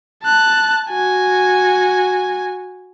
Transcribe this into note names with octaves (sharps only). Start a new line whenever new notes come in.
A5 F#6
F#4 G#5